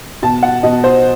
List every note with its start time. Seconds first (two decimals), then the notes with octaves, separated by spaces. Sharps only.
0.22 B2 A5
0.43 F#5
0.63 B2 D#5
0.84 C5